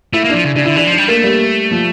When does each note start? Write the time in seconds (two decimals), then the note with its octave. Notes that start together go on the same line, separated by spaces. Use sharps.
0.13 A3 E4
0.24 A#3
0.29 F3 D4
0.44 C#3
0.55 C#3 D4
0.65 D3 E4
0.76 E3 D4
0.87 F3 D4
0.98 G3
1.08 A3 A#3
1.24 G3
1.71 F3